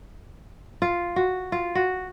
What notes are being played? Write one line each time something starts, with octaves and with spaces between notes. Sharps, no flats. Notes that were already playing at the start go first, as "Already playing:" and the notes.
F4
F#4
F4
F#4